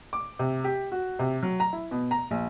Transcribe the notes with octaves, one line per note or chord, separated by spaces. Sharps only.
D6
C3
G4
F#4
C3
F#3
A#5
E4
B2
A#5
A#1